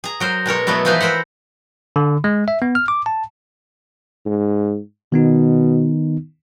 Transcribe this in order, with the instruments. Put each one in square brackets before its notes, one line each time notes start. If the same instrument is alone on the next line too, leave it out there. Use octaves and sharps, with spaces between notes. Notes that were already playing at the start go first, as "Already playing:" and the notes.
[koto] G#4 A#5
F#3 A#4 C5
B2 G#3 A#4 C#5
B2 F#3 A3 B3 E4
E3 F3 D#4 E4 B4 C5
A#4 C5 E5 F#5
[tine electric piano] D3
G#3
E5
B3
F6
D6
A5
[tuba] G#2
[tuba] B2 [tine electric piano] D#3 B3 D#4